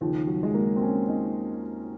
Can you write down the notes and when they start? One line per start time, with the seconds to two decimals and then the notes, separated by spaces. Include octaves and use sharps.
0.01 D#2 C#3 F3
0.27 F#3
0.43 G#3
0.54 A#3
0.76 C4
0.81 C#4
1.08 D#4